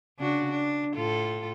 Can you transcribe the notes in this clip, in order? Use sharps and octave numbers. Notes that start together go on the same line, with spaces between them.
C#3 D4 F#4
D4
A2 F4 A4